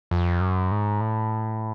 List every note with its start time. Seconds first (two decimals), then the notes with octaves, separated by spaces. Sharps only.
0.11 F2
0.41 F#2
0.71 G#2
1.00 A2